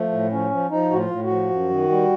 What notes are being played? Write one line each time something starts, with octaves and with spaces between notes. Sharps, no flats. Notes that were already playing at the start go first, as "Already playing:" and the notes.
Already playing: F3 A3
A2
F3 C#4
F3
F3 D#4
A2 F#4
F4
A2
F#4
F3
F#2
D#3
G3